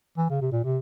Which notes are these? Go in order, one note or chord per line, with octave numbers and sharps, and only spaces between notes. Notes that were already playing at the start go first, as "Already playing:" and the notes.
E3
C#3
C3
A#2
C3